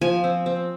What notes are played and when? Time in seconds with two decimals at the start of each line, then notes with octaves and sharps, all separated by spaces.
0.01 F3 G#5
0.24 C4
0.46 C4